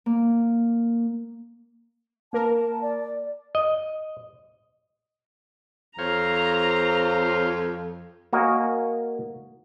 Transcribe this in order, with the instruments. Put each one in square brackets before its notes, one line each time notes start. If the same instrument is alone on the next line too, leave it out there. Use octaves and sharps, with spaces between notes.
[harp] A#3
[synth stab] A#3 A#4 [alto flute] A5
[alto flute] D5
[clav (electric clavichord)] D#5
[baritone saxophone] F2 [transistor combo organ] C5 C#5 F5 [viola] A#5
[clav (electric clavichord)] A#3 F#4 A#4 C#5 D#5 G#5